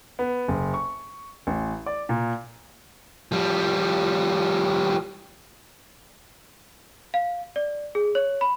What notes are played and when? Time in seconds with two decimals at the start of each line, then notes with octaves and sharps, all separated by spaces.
0.19 B3
0.48 F#1
0.74 C#6
1.47 A1
1.86 D5
2.09 A#2
3.32 F3 G3
7.14 F5
7.56 D5
7.95 G#4
8.15 C#5
8.41 B5